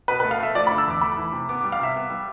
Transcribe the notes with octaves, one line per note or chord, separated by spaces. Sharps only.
B2 B4
A3 B4
F5
A3 E5
F3 D5
B5
D3
E6
E2 D6
A3 B5
E3
C3
B3 D6
G3 D6
F5
C3 E5
B3
G3